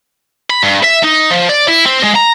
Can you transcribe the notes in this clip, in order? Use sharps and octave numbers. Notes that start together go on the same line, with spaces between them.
B5
G2
E5
D#4
F3
D5
E4
C4
G#3
A#5